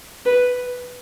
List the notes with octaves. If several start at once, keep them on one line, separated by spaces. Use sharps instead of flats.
B4